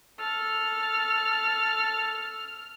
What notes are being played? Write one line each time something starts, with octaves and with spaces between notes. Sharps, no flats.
A4 F6